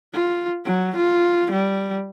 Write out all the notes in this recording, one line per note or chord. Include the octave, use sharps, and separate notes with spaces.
F4
F#3
F4
G3